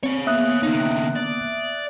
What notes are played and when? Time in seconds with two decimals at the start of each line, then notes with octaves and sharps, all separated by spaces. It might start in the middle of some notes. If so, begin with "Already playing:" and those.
0.03 C4 C#5 F5
0.27 A#3 B3 E5 D#6 F#6
0.63 D3 D#4
1.16 D5